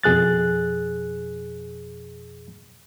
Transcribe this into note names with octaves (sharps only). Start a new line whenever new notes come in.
F2 B2 G#4 F#6 A6